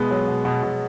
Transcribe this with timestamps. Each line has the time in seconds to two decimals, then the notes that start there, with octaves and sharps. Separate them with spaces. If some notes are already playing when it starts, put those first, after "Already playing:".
Already playing: B2 G#3 B3
0.11 F#3
0.28 B2
0.45 B2
0.63 B2